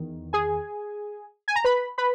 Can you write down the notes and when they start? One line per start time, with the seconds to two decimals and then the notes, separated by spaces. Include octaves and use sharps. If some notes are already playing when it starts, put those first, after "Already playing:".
Already playing: E2 D#3
0.33 G#4 G#5
1.48 G#5
1.56 A#5
1.64 B4 B5
1.98 B4 B5